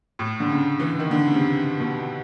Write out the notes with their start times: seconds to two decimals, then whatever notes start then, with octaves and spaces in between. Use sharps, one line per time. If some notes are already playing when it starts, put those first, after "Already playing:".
0.19 A2
0.40 D3
0.50 C#3
0.80 E3
1.00 D#3
1.11 D3
1.27 C#3
1.34 C3
1.80 B2